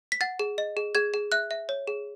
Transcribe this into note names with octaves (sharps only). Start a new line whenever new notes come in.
B6
F#5 A6
G#4
D#5
G#4
G#4 G#6
G#4
E5 F#6
E5
C#5
G#4